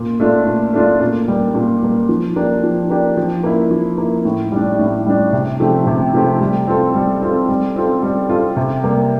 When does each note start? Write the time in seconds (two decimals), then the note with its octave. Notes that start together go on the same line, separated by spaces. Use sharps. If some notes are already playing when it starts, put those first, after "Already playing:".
Already playing: A#2
0.20 A3 D4 F4
0.47 A#2
0.74 A3 D4 F4
1.00 A#2
1.28 G3 A#3
1.55 A#2
1.82 G3 A#3
2.09 F3
2.36 A#3 D4 G4
2.63 F3
2.90 A#3 D4 G4
3.17 F3
3.43 A#3 E4
3.71 F3
3.98 A#3 E4
4.25 A2
4.52 G3 D4
4.79 A2
5.06 G3 D4
5.33 C3
5.60 F3 A3 C4 G4
5.87 C3
6.14 F3 A3 C4 G4
6.41 G3
6.68 C4 F4 A4
6.95 G3
7.22 C4 F4 A4
7.49 G3
7.76 C4 F4 A4
8.03 G3
8.29 C4 F4 A4
8.57 C3
8.84 G3 A#3